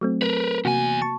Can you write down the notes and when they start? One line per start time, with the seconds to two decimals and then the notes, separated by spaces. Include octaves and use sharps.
0.01 F#3 A3 C4
0.22 A#4 B4
0.65 E2 C3 A#3 F#4 G#5
1.02 A5 C#6